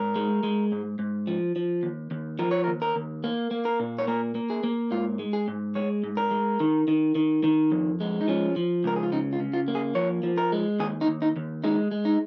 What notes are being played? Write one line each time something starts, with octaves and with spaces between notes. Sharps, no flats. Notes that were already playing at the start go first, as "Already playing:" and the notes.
Already playing: G#2 A#4
G#3
G#3
G#2
G#2
F3
F3
D#2
D#2
F3 A#4
C#5
A#4
D#2
A#4
D#2
A#3
A#3
A#4
A#2
C#5
A#3 A#4
A#3
G#4
A#3
G#2 F4
G#3
G#4
G#2
G#3 C#5
G#2
A#4
G#3
D#3
D#3
D#3
D#3
F2
G#3
D#4
F3 C#4
F3
C#2 A#4
G#4
F4
C#3 D#4
F4
C#3
F4
A#3
G#4
F3 C#5
F3
A#4
G#3
D#2 G#4
D#4
D#2
D#4
D#2
G#3 D#4
G#3
D#4